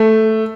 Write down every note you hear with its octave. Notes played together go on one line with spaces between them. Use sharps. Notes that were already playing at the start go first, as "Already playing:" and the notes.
Already playing: A3